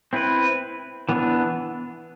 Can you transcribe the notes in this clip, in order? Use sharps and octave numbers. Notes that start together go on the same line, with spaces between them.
C4 E4 B4
E3 B3 D4